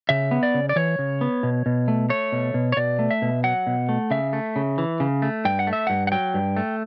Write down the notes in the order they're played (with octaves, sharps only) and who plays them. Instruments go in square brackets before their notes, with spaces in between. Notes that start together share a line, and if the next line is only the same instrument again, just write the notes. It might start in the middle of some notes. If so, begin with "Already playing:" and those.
[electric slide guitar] C#3 E5
B3
D5
C#3
D5
E3 C#5
C#3
B3
B2
B2
A3
A3 C#5
B2
B2
C#5
B2 D5
A3
E5
B2
F#3 F#5
B2
A3
C#3 E5
A3
C#3
E3
C#3
A3
G2 G5
F#5
A3
E5
G2 F#5
F#5
F#3 G5
G2
A3